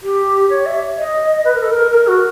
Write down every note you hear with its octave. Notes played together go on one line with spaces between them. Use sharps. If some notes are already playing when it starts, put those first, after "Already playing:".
G4
C#5
E5
D#5
B4
A#4
A4
A#4
A#4
F#4